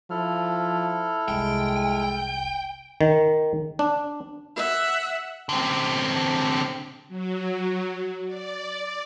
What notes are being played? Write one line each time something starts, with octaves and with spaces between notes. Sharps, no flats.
F3 E4 A4 F6
F1 C2 G#3 G5
D#3
D4
E5 F#5
D3 C4
F#3
D5